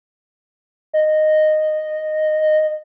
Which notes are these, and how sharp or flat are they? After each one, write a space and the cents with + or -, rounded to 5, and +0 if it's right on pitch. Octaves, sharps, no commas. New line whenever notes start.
D#5 -10